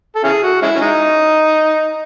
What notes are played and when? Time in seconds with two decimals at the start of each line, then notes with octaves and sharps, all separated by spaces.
0.16 A4
0.24 C#4 E4 G#4
0.43 F#4
0.62 G#3 C#4 E4
0.76 C#4
0.81 G#3 D#4